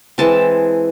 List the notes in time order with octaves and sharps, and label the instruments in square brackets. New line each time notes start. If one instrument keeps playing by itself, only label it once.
[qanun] E3 G#3 C4 A5